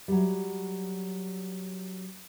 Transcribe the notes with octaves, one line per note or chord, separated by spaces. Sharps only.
F#3 G3